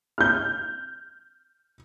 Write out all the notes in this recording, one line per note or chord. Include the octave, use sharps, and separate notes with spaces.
F6 G6